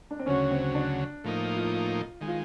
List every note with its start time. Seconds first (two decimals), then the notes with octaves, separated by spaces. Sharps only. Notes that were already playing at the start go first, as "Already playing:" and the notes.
0.11 D4
0.19 C4
0.26 D2 C#3 F#3 C#4
0.51 C4
0.75 D4
1.24 A2 F3 A#3 D#4
1.57 F4
2.21 D#3 G#3
2.28 F4